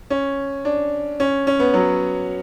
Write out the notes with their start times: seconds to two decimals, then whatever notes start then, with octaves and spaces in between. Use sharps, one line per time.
0.10 C#4
0.65 D4
1.20 C#4
1.47 C#4
1.60 B3
1.74 F#3